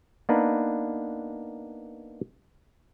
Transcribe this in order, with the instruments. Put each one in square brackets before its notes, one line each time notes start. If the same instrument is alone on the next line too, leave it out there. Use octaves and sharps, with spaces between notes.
[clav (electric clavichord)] A#3 B3 D4 D#4 B4